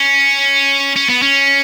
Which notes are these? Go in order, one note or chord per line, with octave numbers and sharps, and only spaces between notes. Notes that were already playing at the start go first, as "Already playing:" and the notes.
Already playing: C#4
C#4
B3
C#4